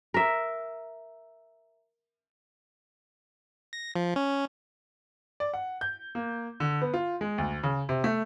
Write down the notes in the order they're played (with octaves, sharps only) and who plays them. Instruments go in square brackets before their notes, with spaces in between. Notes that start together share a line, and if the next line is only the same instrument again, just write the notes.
[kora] A#4 E5
[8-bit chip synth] A#6
F3
C#4
[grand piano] D5
F#5
G6
A#3
D3
B3
F4
G#3
D2
C#3
C3
A3